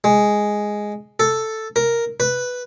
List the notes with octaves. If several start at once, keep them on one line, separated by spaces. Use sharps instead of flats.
G#3
A4
A#4
B4